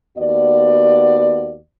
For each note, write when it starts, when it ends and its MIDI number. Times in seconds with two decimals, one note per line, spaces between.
0.18 1.58 39
0.18 1.58 59
0.18 1.58 66
0.18 1.58 74